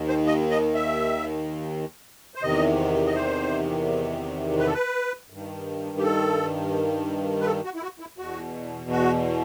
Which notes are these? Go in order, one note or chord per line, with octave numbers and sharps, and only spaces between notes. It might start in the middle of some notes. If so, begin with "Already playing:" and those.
Already playing: D#2 D#3
C5
D#5
D#5
E5
C5
E2 C3 D#3 D#5
D#5
C5
B4
A4
B4
G2 D#3
G4
A4
B4
A4
F#4
E4
F#4
E4
E2 B2 F#4
F#4